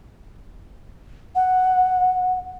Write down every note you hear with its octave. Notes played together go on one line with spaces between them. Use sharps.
F#5